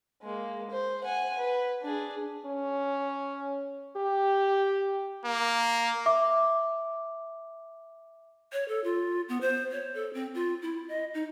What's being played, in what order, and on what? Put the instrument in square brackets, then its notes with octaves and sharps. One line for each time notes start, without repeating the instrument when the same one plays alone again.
[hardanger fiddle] G#3 A#3
C5
F#5 G#5
B4
D4 G#4
[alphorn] C#4
G4
[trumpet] A#3
[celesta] E5 D6
[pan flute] C#5
A4
F4
B3
C5
C#5
A4
C4
F4
E4
D#5
D#4